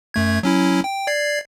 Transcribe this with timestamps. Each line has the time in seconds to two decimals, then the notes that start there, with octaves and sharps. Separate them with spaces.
0.14 F#2 A3 G#6
0.43 F#3 C#4 E4
0.84 G5
1.07 D5 G#6 C7